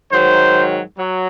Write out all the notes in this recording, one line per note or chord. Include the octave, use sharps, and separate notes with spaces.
G#2 D#3 F#3 C5
F#3